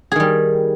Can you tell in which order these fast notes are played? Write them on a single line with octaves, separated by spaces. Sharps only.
G#4 D#3 G3